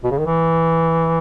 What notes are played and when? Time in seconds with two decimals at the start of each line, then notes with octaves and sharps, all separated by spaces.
0.04 B2
0.11 C#3
0.19 D#3
0.26 E3